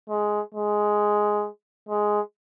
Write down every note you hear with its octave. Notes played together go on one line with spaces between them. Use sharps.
G#3
G#3
G#3